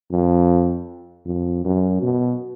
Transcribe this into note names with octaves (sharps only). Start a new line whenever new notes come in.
F2
F2
F#2
B2